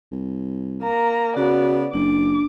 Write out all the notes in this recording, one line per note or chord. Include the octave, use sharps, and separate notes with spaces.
C2
A#3 A#5
C#3 B3 F#4 D5
F#1 D4 D6